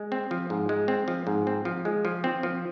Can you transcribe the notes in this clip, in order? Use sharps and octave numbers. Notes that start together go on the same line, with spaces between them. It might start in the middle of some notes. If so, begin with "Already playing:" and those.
Already playing: G#3
C4
F3
G#2
G#3
C4
F3
G#2
C4
F3
G#3
F3
C4
F3